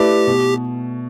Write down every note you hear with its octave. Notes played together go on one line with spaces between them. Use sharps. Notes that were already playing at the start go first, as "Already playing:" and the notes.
Already playing: A3 E4 G4 B4 D5
B2